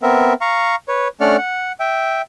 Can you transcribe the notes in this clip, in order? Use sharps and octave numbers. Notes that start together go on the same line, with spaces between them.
B3 C4 A#4 E5
F5 A#5 C#6
B4 C#5
A3 C#4 D4 D5 F#5 F6
F#5
E5 G5